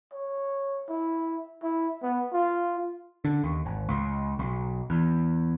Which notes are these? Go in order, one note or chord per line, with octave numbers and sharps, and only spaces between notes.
C#5
E4
E4
B3
F4
D3
D#2
G#1
C#2
B1
E2